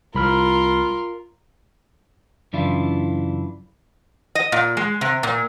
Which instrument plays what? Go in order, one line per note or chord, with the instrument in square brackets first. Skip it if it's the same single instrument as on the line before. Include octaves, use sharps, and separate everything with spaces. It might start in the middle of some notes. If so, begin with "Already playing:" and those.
[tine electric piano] C2 B5 F6 [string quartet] F4 A#4 C6
[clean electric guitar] F#2 C#3 E3 D4 E4 F4
[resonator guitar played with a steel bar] D#5
A#2
G#3
C3
A#2